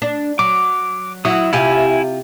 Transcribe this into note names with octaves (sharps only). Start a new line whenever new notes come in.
D4
F#3 D6
F#3 E4 F#4 D#6
C3 E4 F4 G4 G#5